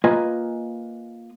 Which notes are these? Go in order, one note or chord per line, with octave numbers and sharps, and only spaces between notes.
A#3 F4 B4 D#5 G#5